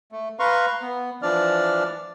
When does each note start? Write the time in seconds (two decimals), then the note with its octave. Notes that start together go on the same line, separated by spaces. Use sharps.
0.12 A3
0.39 B4 F5 A#5 C6 C#6
0.82 B3
1.22 E3 F3 D4 D5 F6